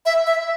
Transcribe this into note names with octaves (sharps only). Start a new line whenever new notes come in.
E5
E5